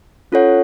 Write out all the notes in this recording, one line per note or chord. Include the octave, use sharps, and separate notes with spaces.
C#4 F4 A4 C#5 F#5